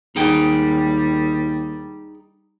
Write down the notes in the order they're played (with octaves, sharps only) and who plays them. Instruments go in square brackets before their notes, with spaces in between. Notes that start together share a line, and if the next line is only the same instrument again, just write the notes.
[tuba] D#2 [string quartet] G3 [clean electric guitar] D#4 G#4 G5